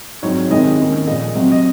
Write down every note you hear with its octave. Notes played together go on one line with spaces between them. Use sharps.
G#2 F#3 C4 D#4 C#5
C3 D#3 G#3 C4 D#4 D#5
D#2 D#3 A#3 C#4
A#2 F3 G#3 D#5
C3 F#3 C4
D#5